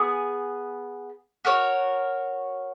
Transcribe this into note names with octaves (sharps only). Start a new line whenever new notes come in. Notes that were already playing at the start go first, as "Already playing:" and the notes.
Already playing: B3 G#4
F#4 A#4 C#5